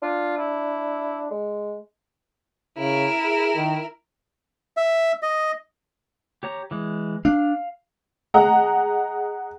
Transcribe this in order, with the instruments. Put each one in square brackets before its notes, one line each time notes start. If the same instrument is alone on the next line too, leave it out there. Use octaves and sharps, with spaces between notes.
[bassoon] D4 [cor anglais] F4
[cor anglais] E4
[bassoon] G#3
[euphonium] C#3 [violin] E4 A#4
[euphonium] G#4
D#3
[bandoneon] E5
D#5
[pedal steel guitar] G4 C#5 A#5
E3 G#3
[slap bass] D4 [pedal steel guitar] F5
[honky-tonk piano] G#4 D#5 F#5 A#5